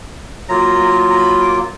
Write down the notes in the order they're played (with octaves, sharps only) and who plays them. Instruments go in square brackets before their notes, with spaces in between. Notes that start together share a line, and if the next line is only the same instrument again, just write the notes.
[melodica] F#3 A#3 F4 A#5
A#5
B5
D6